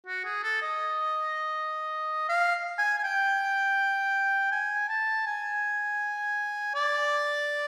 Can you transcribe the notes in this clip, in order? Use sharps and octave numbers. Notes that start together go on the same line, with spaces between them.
F#4
G#4
A4
D#5
F5
G#5
G#5
G5
G#5
A5
G#5
D5